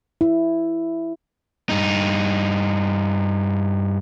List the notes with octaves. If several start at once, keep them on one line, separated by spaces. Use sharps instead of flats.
E4
G2 D#4